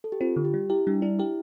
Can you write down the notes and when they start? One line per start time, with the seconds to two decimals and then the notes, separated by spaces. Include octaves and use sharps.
0.04 A4
0.12 G4
0.21 C4 F4
0.36 D3
0.44 G4
0.54 G3
0.70 E4 G4
0.87 G3 D4
1.02 D4 E4
1.19 E4 G4